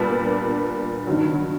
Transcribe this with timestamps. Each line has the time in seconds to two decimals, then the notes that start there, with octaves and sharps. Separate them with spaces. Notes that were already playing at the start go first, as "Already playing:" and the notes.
Already playing: A#2 G3 B3 D4
1.07 G2 D#3 F#3